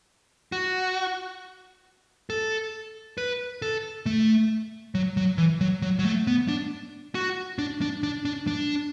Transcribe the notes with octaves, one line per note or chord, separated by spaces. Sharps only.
F#4
A4
B4
A4
A3
F#3
F#3
E3
F#3
F#3
F#3
A3
B3
D4
F#4
D4
D4
D4
D4
D4